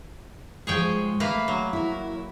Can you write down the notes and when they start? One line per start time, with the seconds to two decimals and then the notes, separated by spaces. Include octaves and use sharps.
0.67 G#2 F3 G#3 G#4 C#5 G5
1.20 A3 A#3 B4 E5 F5
1.48 F#3
1.73 E4 A#4